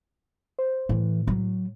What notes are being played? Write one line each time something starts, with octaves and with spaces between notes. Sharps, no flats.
C5
A2 E3
F#3